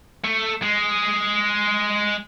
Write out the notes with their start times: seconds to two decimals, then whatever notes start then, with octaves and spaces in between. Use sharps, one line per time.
0.24 A3
0.63 G#3